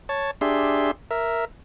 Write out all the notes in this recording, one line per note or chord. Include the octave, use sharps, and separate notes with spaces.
C#5 A5
D4 G4 G#4 E5 C6
A#4 E5